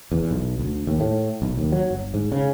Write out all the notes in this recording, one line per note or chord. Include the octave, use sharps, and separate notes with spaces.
E2
B1
D2
D#2
A2
B1
D#2
F#3
G1
G#2
C#3